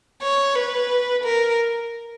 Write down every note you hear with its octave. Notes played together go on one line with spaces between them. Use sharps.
C#5
B4
A#4